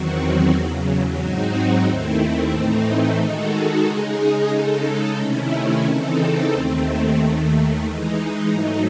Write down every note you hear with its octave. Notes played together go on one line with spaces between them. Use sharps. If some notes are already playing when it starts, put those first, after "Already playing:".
Already playing: E2 D#3 F#3 C4 F#4
E2 C#3 F#3
G#2 F#3 C4 D#4 F#4
D#2 D#3 A3 C4 E4
A2 E3 A3 C4 D#4
D#3 G#3 D#4 F#4 A4
C#3 G#3 D#4 G#4
C#3 G#3 D#4 A4
C3 D#3 A3 C#4 E4
C#3 E3 C4 D#4 A4
D#2 D#3 A3 C4
D#2 D#3 A3
E3 G#3 D#4
G#2 F#3 A3 D#4